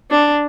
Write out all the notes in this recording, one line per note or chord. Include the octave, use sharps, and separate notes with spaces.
D4